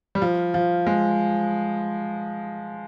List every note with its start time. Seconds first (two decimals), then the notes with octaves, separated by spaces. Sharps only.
0.15 G3
0.22 F3
0.54 F3
0.87 G#3